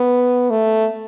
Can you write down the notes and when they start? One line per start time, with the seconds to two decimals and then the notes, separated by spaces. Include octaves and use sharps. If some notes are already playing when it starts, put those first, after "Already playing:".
Already playing: B3
0.50 A3